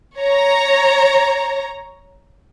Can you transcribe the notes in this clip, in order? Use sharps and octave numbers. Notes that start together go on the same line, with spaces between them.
C#5 A#5